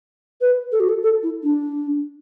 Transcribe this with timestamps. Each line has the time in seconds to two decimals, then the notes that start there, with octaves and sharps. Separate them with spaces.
0.41 B4
0.72 A4
0.80 F#4
0.89 A4
1.03 A4
1.23 E4
1.44 D4